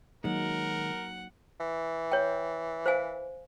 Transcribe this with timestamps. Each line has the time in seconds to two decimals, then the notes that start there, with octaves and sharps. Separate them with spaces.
0.24 D#3 F#3 G#3 A#3 D#4 A#4 F#5
1.60 E3
2.12 C#5 G5
2.86 C5 F5 G#5